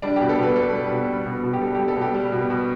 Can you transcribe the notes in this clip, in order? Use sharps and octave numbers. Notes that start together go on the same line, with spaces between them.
G3 D4
B2 G4
A4
B2 B4
G3 A4
G3
B2
G3
B2
B2
G4
G3 A4
G3 G4
A4
B2 G4
G3
B2
B2